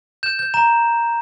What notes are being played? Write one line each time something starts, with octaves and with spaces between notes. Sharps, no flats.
G6 E7
G6
A#5 E7